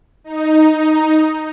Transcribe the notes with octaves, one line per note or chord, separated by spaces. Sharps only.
D#4